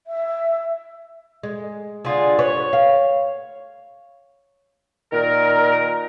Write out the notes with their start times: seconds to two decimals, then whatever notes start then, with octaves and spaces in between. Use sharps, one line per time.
0.07 E5
1.43 G#3
2.05 D3 F4 G#4
2.39 B4 C#5
2.73 F5
5.13 A#2 D#3 A#4